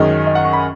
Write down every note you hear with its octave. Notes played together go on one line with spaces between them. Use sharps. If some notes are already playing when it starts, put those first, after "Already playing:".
Already playing: F#2 D#3 G#3 C#4 D#5
D#5
F#5
C#6
B5